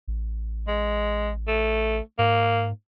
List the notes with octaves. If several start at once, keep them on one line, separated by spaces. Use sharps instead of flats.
A1
G#3
A3
G#2 A#3